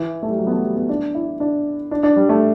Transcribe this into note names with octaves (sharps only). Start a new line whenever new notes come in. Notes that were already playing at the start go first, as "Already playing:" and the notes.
Already playing: E3
A3
G3
F#3
B3
A3
G3
B3
D4
E4
D4
D4
D4
G3
A3